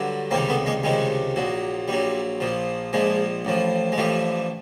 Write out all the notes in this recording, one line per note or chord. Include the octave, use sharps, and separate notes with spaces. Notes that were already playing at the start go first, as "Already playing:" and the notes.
Already playing: G2 D3 F#3
C#2 C3 D#3 G3 A#3 C4
A3 B3
G#3 A#3
C#2 C3 D#3 G3 G#3
A#1 A#2 F#3
A#1 A#2 F#3 G3
A#1 A#2 F3
A#1 A#2 F3 G#3
A1 A2 F3
G#3
A1 A2 F3 G3 A3